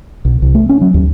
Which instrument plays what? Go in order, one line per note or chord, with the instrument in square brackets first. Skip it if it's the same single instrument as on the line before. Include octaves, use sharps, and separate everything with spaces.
[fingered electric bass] B1
C2
A3
C#4
F#3
D#2